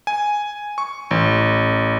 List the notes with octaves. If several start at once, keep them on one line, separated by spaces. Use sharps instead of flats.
G#5
C#6
A1